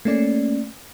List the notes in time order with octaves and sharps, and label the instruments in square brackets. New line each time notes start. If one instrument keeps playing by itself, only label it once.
[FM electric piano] A3 A#3 C#4 D5